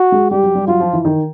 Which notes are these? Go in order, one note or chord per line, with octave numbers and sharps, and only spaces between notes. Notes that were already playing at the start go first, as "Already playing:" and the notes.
Already playing: F#4
G#3
G3 G4
F#3
G3
F#3 F4
F3
E3
D#3